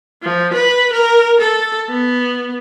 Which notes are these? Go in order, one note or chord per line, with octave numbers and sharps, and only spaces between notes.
F3
B4
A#4
A4
B3